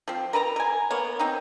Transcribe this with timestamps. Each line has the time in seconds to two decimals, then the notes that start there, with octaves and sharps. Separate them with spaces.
0.08 F3 C4
0.33 A#4 B4 A5 A#5
0.56 A#4 G#5
0.90 A#3 B3 C#5
1.19 C4 D#4